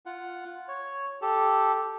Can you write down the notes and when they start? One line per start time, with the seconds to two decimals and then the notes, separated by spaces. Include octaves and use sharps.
0.06 F4 F#5
0.68 C#5
1.22 G4 A4